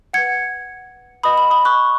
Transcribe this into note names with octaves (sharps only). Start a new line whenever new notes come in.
B4 F#5 G#6 C#7
B4 D#5 F#5 B5 D#6
B5
B5 D#6
C#6 F#6